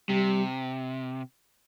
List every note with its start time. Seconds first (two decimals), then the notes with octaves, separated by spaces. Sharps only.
0.09 C3 G3